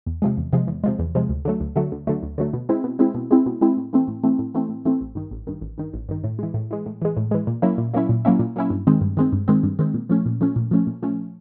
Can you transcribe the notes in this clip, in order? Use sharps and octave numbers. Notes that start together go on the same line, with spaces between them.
E2
C3 F3 G#3
E2
C3 F3 G#3
E2
C3 F3 G#3
E2
C3 F3 G#3
D2
D3 F#3 A3
D2
D3 F#3 A3
D2
D3 F#3 A3
D2
D3 F#3 A3
B2
G#3 C4 E4
B2
G#3 C4 E4
B2
G#3 C4 E4
B2
G#3 C4 E4
A2
E3 A3 C4
A2
E3 A3 C4
A2
E3 A3 C4
A2
E3 A3 C4
A1
G2 D#3
A1
G2 D#3
A1
G2 D#3
A1
G2 D#3
A2
E3 G#3
A2
E3 G#3
A2
E3 G#3
A2
E3 G#3
A#2
F#3 A#3 C#4 E4
A#2
F#3 A#3 C#4 E4
A#2
F#3 A#3 C#4 E4
A#2
F#3 A#3 C#4 E4
G2
D#3 G#3 C4
G2
D#3 G#3 C4
G2
D#3 G#3 C4
G2
D#3 G#3 C4
A#2
F3 A3 C#4
A#2
F3 A3 C#4
A#2
F3 A3 C#4
A#2
F3 A3 C#4